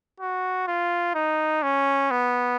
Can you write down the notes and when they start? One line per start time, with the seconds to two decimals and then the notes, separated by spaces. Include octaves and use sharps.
0.20 F#4
0.67 F4
1.15 D#4
1.63 C#4
2.11 B3